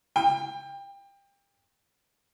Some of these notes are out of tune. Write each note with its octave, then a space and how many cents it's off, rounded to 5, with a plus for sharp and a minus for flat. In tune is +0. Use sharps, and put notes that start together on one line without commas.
G5 +25